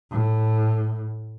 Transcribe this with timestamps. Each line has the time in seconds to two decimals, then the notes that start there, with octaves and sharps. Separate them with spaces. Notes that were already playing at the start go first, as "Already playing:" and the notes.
0.11 A2